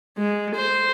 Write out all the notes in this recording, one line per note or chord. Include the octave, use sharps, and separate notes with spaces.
G#3
C5